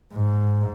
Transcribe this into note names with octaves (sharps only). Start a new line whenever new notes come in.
G#2